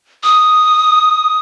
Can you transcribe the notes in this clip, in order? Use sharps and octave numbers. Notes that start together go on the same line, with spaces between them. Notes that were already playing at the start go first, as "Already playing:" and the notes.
D#6